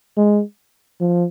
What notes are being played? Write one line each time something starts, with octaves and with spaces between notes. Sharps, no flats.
G#3
F3